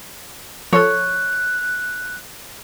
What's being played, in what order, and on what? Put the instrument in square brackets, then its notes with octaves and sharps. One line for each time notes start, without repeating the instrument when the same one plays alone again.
[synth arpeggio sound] F3 A4 [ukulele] C#5 [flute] F#6